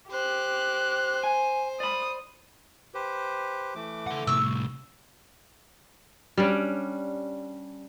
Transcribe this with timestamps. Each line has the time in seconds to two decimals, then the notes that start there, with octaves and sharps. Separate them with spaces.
0.11 G4 C5 F#6
1.24 G#5
1.80 D5 B5 D#6
2.94 G4 B4 C5
3.75 E3 A3 D6
4.07 A4 F#5
4.27 C2 A2 C#6 E6
6.37 G3 C#4 D4